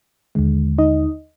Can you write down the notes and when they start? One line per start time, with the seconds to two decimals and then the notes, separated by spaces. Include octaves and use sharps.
0.35 D#2 D3 G#3
0.78 D#4 D#5